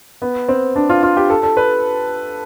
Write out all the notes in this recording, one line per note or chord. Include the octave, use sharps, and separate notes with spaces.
B3
C4
D4
F4
F4
G4
A4
A4
B4